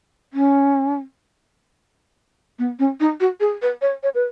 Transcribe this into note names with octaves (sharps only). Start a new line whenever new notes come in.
C#4
B3
C#4
D#4
F#4
G#4
B4
C#5
C#5
B4